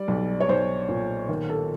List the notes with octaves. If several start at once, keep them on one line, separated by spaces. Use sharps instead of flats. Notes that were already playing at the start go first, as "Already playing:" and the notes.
Already playing: G3 D5
B1
C#5
B1 C5
A#2
D#3
A4